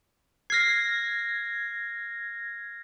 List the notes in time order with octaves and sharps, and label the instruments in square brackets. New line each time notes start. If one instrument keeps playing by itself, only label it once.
[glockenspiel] F6 C7 [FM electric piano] G#6 A#6